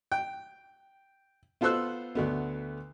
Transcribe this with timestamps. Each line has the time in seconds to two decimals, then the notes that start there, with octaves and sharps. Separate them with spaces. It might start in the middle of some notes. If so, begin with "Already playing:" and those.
0.12 G5
1.61 B3 F4 A4 C5 E6 F#6
2.15 D2 A3 B3